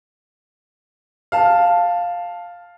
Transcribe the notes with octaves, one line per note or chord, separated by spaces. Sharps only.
F5 A5